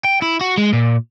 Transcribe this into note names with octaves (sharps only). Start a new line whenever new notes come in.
G5
E4
F#4
G#3
A#2